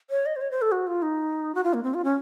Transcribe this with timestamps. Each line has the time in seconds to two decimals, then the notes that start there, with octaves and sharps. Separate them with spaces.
0.10 C#5
0.26 D#5
0.36 C5
0.41 C#5
0.51 C5
0.62 A4
0.72 F#4
0.87 F4
1.02 D#4
1.55 F#4
1.64 F4
1.74 A#3
1.83 C4
1.94 F4
2.04 C#4